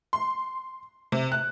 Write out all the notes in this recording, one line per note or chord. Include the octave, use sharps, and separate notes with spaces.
C6
C3
F#6